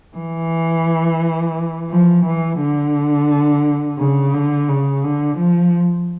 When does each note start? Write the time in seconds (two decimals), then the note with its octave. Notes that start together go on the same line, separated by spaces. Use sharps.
0.18 E3
1.91 F3
2.26 E3
2.60 D3
3.99 C#3
4.34 D3
4.69 C#3
5.04 D3
5.38 F3